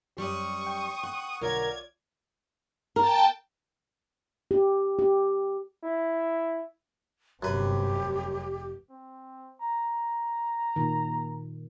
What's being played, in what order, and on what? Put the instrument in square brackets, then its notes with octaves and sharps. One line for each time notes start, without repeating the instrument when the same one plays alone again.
[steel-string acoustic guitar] F#2 G3 C5 [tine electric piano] G4 [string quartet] C#6 D#6
[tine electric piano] G5
[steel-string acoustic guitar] F#5
[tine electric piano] B1 D3 F#5 [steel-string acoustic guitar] F4 C#5 D5 [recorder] A#4 [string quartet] G#6
[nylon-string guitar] A#4 [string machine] G5 A5
[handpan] G4
G4
[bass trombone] E4
[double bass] G1 C3 [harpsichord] F#2 B4 [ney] G4
[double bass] F1
[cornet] C4
A#5
[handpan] A#2 D#3